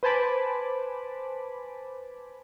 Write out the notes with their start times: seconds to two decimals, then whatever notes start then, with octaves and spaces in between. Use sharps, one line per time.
0.03 B4 C5 G#5 A5 B5 D6